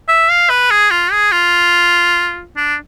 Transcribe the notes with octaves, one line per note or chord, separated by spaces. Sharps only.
E5
F5
B4
G#4
F4
G#4
F4
D4